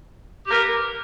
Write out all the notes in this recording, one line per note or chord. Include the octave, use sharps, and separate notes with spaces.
G4 A#4 B4